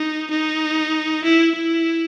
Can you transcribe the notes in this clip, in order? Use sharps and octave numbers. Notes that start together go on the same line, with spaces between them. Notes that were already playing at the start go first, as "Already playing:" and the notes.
Already playing: D#4
D#4
E4
E4